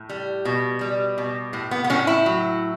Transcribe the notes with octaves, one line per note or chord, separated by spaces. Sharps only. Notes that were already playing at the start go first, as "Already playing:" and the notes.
Already playing: A2
G3
B2
G3
B2
A2
B3
B3
A2 C#4
E4
F#3